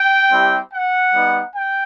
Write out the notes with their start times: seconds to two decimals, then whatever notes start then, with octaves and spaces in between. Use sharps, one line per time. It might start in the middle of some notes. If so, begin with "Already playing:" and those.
Already playing: G5
0.30 G3 C4 E4 G4
0.71 F#5
1.12 G3 B3 D#4
1.54 G5